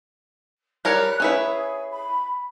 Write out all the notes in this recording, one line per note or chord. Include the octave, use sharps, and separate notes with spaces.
G3 A#4 C#5 F#6
C#4 E4 G#4 B4
B5